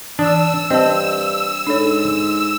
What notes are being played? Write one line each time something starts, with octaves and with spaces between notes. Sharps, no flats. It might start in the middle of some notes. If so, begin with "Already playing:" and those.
E3 D4 E6
G2 C4 D#5 A5
G#2 D4 A4 C#5